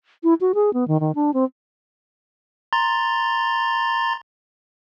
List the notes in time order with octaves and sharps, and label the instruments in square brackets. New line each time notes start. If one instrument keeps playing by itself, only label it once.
[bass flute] E4
F#4
G#4
B3
D#3
D#3
D4
C4
[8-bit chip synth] A#5 C6 A6